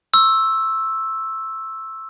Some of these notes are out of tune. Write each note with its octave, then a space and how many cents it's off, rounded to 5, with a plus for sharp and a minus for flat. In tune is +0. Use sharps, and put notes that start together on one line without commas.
C#6 -45 E6 +0